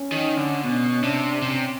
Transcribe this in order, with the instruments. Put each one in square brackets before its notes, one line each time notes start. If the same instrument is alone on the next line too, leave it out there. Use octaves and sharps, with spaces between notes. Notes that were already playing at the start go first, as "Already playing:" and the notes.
Already playing: [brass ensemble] C#4
[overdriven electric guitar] D#3
D3
[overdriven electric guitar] B2 [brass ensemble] C#4
[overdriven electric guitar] C3 [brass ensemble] D4
[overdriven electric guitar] C3 [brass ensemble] C#4